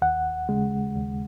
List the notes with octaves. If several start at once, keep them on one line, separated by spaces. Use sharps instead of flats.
D#2 F#5
C#3 G#3
D#2